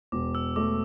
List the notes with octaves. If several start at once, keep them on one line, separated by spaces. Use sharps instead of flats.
E1 D6
E6
A3 D6